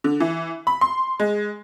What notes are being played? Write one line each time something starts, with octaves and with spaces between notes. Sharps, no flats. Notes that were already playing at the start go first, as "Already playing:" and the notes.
D3
E3
B5
C6
G#3